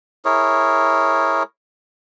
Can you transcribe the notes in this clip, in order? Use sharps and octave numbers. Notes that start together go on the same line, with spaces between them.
E4 G#4 A#4 C#5